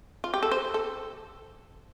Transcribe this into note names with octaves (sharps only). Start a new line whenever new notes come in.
F4
G4
A4
C5
A4